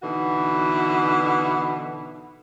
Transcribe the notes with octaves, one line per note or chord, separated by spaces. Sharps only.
B2 D3 E3 D#4 F#4